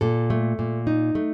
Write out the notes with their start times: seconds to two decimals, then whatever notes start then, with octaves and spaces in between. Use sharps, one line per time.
0.01 A#2 A4
0.30 A3
0.59 A#2
0.87 D#4
1.15 A3